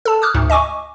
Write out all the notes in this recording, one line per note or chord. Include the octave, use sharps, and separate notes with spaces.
A4 A5
D6 D#6 F6 F#6
D2 G#2
D#5 G#5 C#6 D6